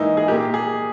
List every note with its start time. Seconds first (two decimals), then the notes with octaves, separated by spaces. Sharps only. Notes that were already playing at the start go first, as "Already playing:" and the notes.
Already playing: G#2 E3 A#3 D#4 E4
0.17 G#4
0.28 A#2 A#3 G4
0.54 G#4